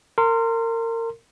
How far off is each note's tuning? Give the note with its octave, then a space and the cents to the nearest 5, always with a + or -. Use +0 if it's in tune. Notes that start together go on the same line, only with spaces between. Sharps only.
A#4 -30 C6 +0